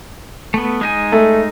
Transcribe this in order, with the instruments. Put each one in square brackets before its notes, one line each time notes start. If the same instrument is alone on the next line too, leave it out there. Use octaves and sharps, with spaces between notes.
[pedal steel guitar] A3 B3
G#3 D#4 G#5
[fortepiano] A3